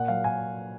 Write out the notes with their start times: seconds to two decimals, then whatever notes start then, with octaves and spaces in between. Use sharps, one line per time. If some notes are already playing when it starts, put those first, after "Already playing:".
Already playing: A#2 F#5
0.08 F#3 F5
0.24 A#2 G#5